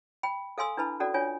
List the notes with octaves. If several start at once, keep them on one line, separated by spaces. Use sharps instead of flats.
G5 B5
A4 F5 G#5 C6 E6
D4 E4 B4 A5 B5
C#4 F#4 A4 D5
D4 F4 C#5 G#5